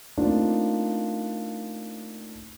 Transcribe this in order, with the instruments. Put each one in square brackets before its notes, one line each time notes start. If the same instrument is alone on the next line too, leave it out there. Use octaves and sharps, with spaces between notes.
[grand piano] A3 A#3 C4 D4 D#4 F4